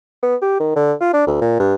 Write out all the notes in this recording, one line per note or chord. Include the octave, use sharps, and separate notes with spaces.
B3
G4
D#3
D3
F4
D4
D2
A#2
G2